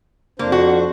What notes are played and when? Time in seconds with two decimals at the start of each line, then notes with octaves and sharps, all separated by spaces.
0.39 F2 A#3 D4 C5
0.52 F#4